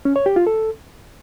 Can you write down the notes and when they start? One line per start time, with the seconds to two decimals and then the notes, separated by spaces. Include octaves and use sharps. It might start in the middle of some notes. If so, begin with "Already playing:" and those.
0.05 C#4
0.16 C#5
0.26 G4
0.36 F4
0.47 A4